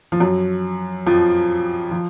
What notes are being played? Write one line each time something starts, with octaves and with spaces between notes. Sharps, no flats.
F3
F#2 F#3
F2 F3
F3